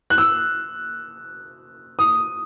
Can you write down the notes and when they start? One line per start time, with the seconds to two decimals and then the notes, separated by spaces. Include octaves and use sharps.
0.10 F#6
0.18 E6
1.99 D#6